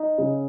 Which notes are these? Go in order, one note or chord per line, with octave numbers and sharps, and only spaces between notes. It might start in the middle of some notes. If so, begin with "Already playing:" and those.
Already playing: D#4
C#3